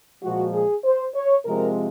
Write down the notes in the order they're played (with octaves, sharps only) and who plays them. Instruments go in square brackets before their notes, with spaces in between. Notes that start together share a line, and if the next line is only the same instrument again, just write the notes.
[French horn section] A#2 F3 G#3 F#4
G#4
C5
C#5
C3 F3 G#3 C4 A#4